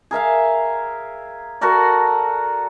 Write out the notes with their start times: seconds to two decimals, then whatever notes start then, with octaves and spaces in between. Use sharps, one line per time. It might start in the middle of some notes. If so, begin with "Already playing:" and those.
0.11 G#4 A#4 E5 F5
1.61 F#4 A4 A#4 D5